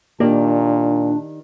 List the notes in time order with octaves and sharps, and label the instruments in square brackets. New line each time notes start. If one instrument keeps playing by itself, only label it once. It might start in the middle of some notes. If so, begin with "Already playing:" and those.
[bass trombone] A#2 [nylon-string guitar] D#3 G4 D5 [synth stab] A#3 [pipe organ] D4